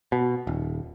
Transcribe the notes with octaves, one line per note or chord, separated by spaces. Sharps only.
B2
D#1